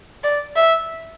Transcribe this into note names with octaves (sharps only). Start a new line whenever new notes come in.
D5
E5